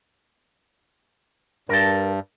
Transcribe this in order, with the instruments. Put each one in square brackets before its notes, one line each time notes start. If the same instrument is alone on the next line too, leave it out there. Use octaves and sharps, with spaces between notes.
[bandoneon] G2 [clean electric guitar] A#4 A5